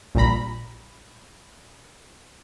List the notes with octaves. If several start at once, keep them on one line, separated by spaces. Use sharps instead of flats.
A#1 A#2 G3 A#5 B5